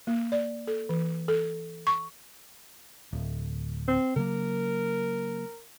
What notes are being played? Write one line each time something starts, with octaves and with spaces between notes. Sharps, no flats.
A#3
D5
A4
E3
A4
C#6
D1
C4
C#3 F#3 A#3 A#4